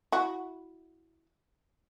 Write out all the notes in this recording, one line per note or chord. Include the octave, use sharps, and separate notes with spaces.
E4 F#4